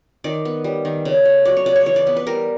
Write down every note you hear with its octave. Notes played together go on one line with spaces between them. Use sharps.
D#3 D5
B3
G3
D#3
C#3
A3
F#3 D5
C#5
C#3 D5
C#5
E3 C#5
D5
B3
B4
G3 A#4